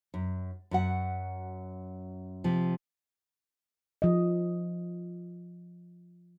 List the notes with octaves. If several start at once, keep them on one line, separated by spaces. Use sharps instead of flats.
F#2
F#2 F#4 F#5
C3 F3
F3 D#5